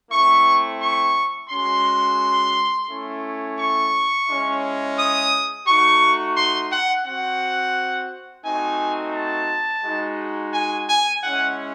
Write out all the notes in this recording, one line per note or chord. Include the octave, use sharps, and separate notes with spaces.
A3 C4 E4 C#6
C#6
G#3 C#4 F#4 C6
A3 C#4 E4
C#6
G#3 C#4 E4
D#6
A3 D#4 F#4 C#6
C6
F#5
C4 F#4 F#5
A3 C4 D#4 F#4 G#5
A5
G#3 D#4 F#4
G#5
G#5
G#3 C#4 E4 F#5